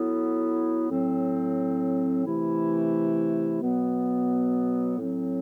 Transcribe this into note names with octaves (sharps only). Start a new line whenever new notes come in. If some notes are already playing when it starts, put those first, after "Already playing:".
Already playing: F#3 B3 E4 A4
A2 F#3 C4
C3 E3 A3 E4
B2 F#3 B3
A2 F#3 C4